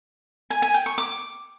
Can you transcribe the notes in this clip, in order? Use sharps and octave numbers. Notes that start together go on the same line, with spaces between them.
G#5
G#5
G5
C#6
D6